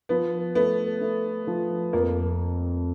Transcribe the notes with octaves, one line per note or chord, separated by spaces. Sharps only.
F3 B3
A3 B3
A3
F3
F2 A#3